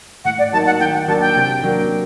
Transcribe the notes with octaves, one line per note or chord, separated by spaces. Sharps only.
A2 F#5
D5
F#3 A#3 D#4 A5
F#5
D#3 G5
F#5
F#3 A#3 D4 A5
G5
C3
F#3 A#3 D4